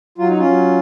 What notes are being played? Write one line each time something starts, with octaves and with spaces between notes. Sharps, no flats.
F#3 F4
D#4
C#4 F4
F#3